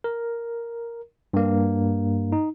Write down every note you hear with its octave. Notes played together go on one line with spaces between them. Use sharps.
A#4
G2 A#3
D#4